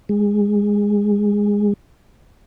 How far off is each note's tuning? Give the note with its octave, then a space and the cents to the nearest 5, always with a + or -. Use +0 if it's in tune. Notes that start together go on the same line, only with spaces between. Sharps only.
G#3 -15